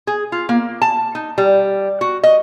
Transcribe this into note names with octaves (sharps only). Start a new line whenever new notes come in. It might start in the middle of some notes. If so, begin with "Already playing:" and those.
G#4
F4
A#3
A5
D#4
G3
F#4
D#5